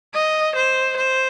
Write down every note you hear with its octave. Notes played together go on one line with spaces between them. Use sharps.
D#5
C5
C5